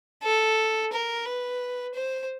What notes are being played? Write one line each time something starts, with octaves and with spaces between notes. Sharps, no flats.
A4
A#4
B4
C5